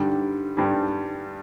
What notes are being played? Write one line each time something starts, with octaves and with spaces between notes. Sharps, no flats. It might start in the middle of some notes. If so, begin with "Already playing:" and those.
Already playing: G2 D3 G3
G2 D3 G3